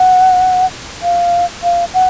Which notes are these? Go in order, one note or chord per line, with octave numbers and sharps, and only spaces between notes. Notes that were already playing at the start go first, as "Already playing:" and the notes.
Already playing: F#5
F5
F5
F#5